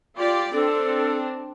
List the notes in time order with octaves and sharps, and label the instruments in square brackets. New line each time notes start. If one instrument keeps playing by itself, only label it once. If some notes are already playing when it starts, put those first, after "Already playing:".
[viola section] F4 G4 D5
[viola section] C4 D4 [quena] A4